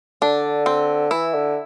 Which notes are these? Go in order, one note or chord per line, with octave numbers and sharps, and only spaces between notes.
D3 D4
C4
E3 E4
D3